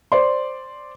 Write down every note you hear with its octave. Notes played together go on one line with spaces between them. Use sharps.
C5 D5 C6